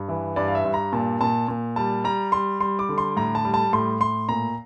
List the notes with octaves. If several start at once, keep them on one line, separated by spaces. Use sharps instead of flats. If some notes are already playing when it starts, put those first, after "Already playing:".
Already playing: G2
E3
G2 D5
F5
E5
G2
A#5
A#2 A5
A#2 A5
A#2
G3 A5
G3 A#5
G3 C6
G3 C6
D6
D3
C6
A2 A#5
A5
G3
A5
A2 C6
A2 C6
A#2 A#5